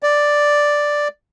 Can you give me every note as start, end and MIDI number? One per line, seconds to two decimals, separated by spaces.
0.03 1.08 74